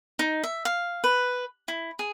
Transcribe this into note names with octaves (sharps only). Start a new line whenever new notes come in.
D#4
E5
F5
B4
E4
G#4